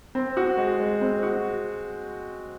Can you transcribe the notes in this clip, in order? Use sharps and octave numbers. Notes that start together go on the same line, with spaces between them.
C4
F#4
G#3
G#3
C4
F#4